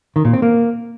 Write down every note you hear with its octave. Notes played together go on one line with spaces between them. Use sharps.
D#3
A#2
C4
A#3